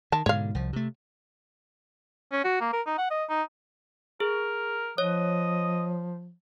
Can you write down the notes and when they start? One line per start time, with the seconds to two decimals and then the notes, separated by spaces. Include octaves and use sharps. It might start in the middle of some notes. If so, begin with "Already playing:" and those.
0.12 D#3 A5
0.26 G#2 B2 D3 C#5 F5
0.55 C2 F3
0.73 C3 A3
2.33 C#4
2.45 F#4
2.61 A#3
2.73 A#4
2.87 D#4
2.98 F#5
3.11 D#5
3.29 D#4
4.20 G#4 A#4
4.98 F3 C#5 D#5